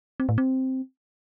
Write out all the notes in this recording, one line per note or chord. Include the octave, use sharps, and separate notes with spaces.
C4
A2
C4